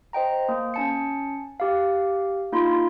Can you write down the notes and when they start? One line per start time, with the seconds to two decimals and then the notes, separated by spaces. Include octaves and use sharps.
0.13 C5 D#5 G5 A#5
0.49 A#3
0.74 C#4 A5 C#7
1.60 G4 F5
2.52 A#3 D#4 F4 B5 C6